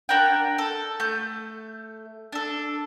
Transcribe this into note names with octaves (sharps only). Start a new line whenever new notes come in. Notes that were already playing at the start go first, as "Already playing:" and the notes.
D4 A#4 F#5 G5
A4
A3 G6
D4 A4